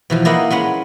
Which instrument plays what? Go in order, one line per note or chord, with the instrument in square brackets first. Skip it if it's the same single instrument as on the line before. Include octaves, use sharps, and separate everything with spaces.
[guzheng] B2 E3 F3
A#3 E4 D#5 F5 F#5
G#3 C#4 B4 F#5